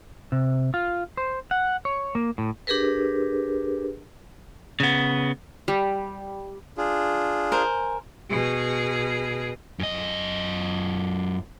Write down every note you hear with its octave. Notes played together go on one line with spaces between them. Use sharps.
C3
F4
C5
F#5
C#5
A#3
A2
D4 G4 G#4 A#4 B4
C#3 B3
G3
D4 F4 G#4
A#4 C5 G#5
B2 G#4
F#2 D#5